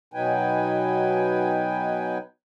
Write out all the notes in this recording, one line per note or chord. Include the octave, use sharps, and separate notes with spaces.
B2 F#3 D#4 B4 G5 G#5